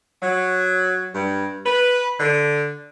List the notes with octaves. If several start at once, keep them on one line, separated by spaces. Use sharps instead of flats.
F#3
G2
B4
D3